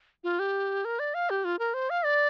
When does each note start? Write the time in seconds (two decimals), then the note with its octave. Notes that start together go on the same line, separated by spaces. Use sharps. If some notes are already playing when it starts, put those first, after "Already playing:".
0.24 F4
0.39 G4
0.85 A#4
0.99 D5
1.14 F5
1.30 G4
1.45 F4
1.59 A#4
1.74 C5
1.90 F5
2.05 D5